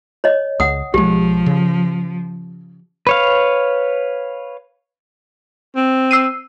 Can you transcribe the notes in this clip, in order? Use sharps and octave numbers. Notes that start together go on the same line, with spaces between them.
C#5 D#5
C#2 F#5 D#6
B1 F3 G#3 G4
C#3
B4 C#5 F5
C4
E6 C7 D#7